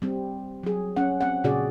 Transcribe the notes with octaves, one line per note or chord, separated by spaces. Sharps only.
G3 C4
F#3 G#4
C#4 F#5
C4 F#5
A#2 C#3 F#4 G#4 D5